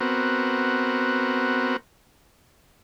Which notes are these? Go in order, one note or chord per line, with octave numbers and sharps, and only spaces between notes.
B3 C4 F#4 A#4